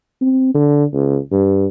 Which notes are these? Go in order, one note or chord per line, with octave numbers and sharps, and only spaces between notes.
C4
D3
C#2
G2